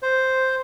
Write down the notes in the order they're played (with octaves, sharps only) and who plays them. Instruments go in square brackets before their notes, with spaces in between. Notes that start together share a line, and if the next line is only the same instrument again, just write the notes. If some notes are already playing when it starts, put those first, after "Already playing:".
[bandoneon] C5